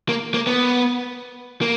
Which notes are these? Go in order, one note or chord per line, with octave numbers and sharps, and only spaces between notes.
A#3
A#3
B3
A#3